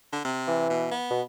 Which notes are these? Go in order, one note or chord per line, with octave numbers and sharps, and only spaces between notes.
D3
C3
E3
B2
B3
B2